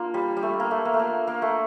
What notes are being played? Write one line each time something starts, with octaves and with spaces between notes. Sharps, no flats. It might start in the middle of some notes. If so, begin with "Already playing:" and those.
Already playing: A#3 D4 F4
G3
G3
A3
A#3
A3
A#3
A3
A#3
A#3
A3